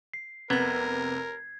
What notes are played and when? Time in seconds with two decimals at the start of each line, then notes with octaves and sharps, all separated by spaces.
0.14 C7
0.50 F1 C3 B3 A#4 G#6